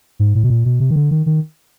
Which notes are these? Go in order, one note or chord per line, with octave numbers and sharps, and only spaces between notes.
G#2
A2
B2
A#2
B2
C3
D#3
D3
D#3
D#3